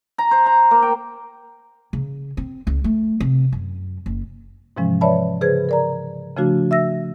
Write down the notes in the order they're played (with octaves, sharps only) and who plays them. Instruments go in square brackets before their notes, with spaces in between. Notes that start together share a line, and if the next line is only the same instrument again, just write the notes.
[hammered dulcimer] A#5
C5
A#5
A#3
G5
[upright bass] C#3
C4
C#2
A3
C3
F#2
F#1
[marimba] G#2 C3 E3 F3 G#3 C#4
B4 C#5 D5 E5 A5 B5
C#3 G#4 B4 C5 G#6
A#4 D5 A#5
C#3 F3 A3 D4 F#4
E5 E6 A#6